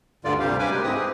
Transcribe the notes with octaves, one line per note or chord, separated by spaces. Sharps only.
D2 G2 D3 F4 D5
D2 G2 C3 G3 G4 F5
C#3 G3 B4 G#5 B5 D6
G#3 G4 A#4
G#2 C4 E4 B4 D#6
G4 G#4